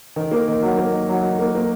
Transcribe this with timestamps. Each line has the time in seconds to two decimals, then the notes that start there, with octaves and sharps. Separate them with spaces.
0.16 D#3
0.31 A#3
0.48 D#3
0.62 F#3
0.77 A#3
0.93 D#4
1.08 F#3
1.23 D#4
1.39 A#3
1.55 A#3